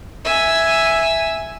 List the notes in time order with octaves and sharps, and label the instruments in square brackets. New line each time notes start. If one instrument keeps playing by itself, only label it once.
[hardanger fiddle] E5 G#5